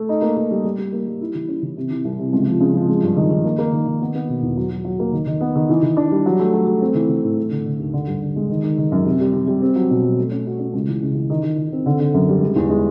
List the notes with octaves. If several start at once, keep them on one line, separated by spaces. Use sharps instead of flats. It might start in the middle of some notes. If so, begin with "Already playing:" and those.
Already playing: A3
D#4
A#3
A#3
G3
G3
G3
A#3
G3
E4
E3
C#4
E3
C3
E3
C2
C3
C#2
F3
C#3
F3
G#3
G2
D#3
D#3
A#3
A#3
D#3
D#3
B3
B3
B2
E2
F#3
F#3
F#3
A#3
D#3
D#3
B3
D#3
E3
E3
D4
G3
F#3
A3
F#3
A3
C4
E3
E3
A2
A3
D3
D3
D#2
D3
G2
D3
G#3
D#3
D#3
D#3
F#2
C3
G3
C3
G3
C4
F#3
B2
F#3
A3
C#4
F#4
C#4
C#2
E3
C#3
E3
D#3
D#3
D#3
C4
D3
D3
F#2
G3
G#3
E2
G#3